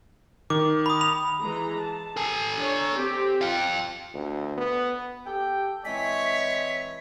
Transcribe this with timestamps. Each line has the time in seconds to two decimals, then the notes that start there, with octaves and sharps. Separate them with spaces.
0.50 D#3 D6
0.86 B5 D#6
1.01 B5 F7
1.41 E3 G#3 A#5
1.82 A5
2.17 A4 G#5
2.55 D4 C#5
2.94 C4 G4
3.41 F4 F5 G5
4.14 D2
4.57 B3
5.26 G4 A4 G5
5.85 E3 G#3 C4 C#5 D#5 G#5 B6